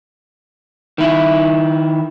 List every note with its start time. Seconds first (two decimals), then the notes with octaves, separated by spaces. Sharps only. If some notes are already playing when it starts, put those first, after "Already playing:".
0.98 D#3 E4